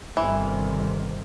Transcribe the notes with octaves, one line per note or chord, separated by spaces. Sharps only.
G1 C3 D#3 E3